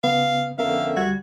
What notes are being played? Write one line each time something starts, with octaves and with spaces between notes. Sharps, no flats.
C#3 B3 F5
F2 D3 B3 C#4 A#4 E5 F5
D2 G3 F#4 G#6